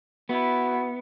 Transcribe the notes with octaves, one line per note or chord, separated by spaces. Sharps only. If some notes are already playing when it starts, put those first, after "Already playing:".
B3 E4 F#4